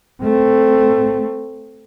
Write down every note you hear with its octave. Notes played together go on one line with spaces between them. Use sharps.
A3 C4